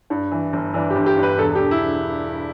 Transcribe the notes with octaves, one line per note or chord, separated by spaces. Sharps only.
G2
E3
G1
E3 D4
G4
G1
G4
G2
B4
E1 A4
G4
E1
E4